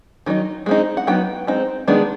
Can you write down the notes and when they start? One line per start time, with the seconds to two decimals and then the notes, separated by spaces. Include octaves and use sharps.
0.26 D#3 F#3 D#4
0.66 G#3 C4 D#4
0.97 F#5
1.07 F#3 B3 D#4 G5
1.47 G#3 C4 D#4
1.88 D#3 G#3 B3 D4